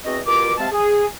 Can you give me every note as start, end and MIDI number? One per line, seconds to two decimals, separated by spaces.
0.04 0.19 40
0.04 0.19 60
0.04 0.19 66
0.04 0.19 75
0.25 0.53 47
0.25 0.53 65
0.25 0.53 67
0.25 0.53 70
0.25 0.53 86
0.58 0.66 48
0.58 0.66 56
0.58 0.66 60
0.58 0.66 77
0.58 0.66 81
0.72 1.05 68